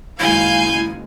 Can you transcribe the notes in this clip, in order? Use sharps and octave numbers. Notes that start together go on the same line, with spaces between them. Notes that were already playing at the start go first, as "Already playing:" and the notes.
F#1 D#3 G#3 E4 F5 G#5 G6